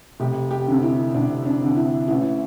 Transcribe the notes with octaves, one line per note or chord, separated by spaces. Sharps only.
F1 G4
G4
F2 D3
E4
F1 D4
D4
F2 D3
E4
A1 E4